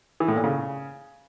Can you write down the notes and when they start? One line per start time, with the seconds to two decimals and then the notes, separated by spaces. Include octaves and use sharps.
0.20 E3
0.28 A2
0.36 A#2
0.44 C#3